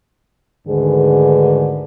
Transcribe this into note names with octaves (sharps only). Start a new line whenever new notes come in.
D2 G#2 D3 D#3 G#4 B4